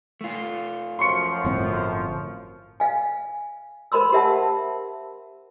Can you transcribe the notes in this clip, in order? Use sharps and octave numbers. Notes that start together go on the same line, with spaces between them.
A3 F4
F#2 F3 C6 C#6 C#7
G1 A2 C4
F5 G#5
A#4 C5 B5 C6 E6
G4 A#4 E5 F#5 A5